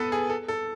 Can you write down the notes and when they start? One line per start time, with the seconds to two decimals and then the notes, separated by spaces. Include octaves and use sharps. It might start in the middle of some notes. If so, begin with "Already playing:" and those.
Already playing: B3 A4 B4
0.12 G#4
0.30 A4
0.48 A4